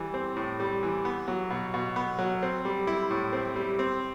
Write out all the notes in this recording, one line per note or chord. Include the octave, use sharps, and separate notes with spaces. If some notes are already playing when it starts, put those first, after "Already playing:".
Already playing: E3 G3
C4
A2
G3
E3
B3
F#3
B2
B2
B3
F#3
C4
G3
E4
A2
C4
G3
C4